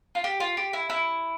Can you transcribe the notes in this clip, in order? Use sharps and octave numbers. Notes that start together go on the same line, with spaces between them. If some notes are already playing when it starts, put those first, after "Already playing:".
F4
G4
F4
G4
E4
E4